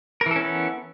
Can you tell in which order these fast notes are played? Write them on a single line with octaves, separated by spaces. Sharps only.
A#4 E3 A4 C#4 B3